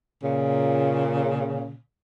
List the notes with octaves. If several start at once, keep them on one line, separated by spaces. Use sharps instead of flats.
A#2 C#3